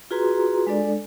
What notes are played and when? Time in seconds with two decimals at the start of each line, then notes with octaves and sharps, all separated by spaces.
0.11 F4 F#4 G#4 B4 A#5 C6
0.67 G#3 D4 A4 D5